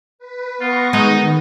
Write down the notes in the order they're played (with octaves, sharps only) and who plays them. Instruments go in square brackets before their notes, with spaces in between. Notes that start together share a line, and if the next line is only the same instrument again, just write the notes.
[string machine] B4
[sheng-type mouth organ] B3 [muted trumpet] F4 [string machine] C#6 A#6
[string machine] D#3 [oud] G#3 [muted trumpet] D#4